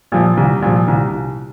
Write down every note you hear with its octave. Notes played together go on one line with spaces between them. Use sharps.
A#2 F3
C2
A#2 F3
C2